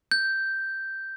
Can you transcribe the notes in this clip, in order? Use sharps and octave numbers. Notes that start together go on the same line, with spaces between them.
G6